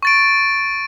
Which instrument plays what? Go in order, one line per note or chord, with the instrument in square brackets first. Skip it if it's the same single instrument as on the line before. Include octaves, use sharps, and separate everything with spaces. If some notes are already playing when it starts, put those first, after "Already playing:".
[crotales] C#6 A6 D7